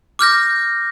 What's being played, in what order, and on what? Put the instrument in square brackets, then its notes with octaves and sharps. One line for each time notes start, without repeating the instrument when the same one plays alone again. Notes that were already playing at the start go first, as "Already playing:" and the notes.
[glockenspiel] D6 F6 G6 A#6